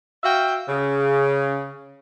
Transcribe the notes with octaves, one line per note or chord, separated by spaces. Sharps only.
F#4 E5 F5 G5
C#3